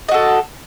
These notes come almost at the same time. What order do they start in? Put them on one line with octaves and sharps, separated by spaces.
D#5 F#4 A4